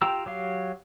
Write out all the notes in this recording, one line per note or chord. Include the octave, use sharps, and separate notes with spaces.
F4 G4 G5 A#5 E6
F#3 G4 F5